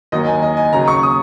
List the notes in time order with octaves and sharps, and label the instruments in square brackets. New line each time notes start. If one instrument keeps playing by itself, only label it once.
[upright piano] D#2 D#3 F#3 D#5
G#5
D#5
G#5
D#2 C#3 F#3 A#5
C#6
D#6